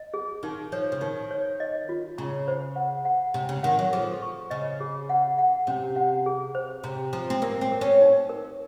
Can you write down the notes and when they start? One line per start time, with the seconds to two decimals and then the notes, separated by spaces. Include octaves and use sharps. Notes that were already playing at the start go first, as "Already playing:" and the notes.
Already playing: D#5
0.14 G#4
0.43 D#3 D#4
0.72 F3 C#5
0.92 C#3
1.01 D#3 D#4
1.31 C#5
1.60 D#5
1.89 F4
2.18 C#3 A#5
2.48 C5
2.76 F#5
3.05 F#5
3.34 C3 A#5
3.49 C#3
3.63 D#3 F#5
3.79 F#3
3.93 F3 G#4
4.22 C#6
4.50 C#3 D#5
4.80 G#4
5.09 F#5
5.38 F#5
5.67 C3 C#4
5.96 F#5
6.26 G#4
6.55 C5
6.84 C3 A#5
7.13 F3 A#5
7.30 C4
7.42 A#3 A#4
7.61 C4
7.72 A#4
7.81 C#4
8.01 D#4
8.30 A#4